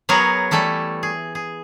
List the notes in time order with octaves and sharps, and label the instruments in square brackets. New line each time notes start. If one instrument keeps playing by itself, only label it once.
[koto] F#3 B3 G#4 A#4 C#5 F#5
E3 G3 A3 A4
G#4
G#4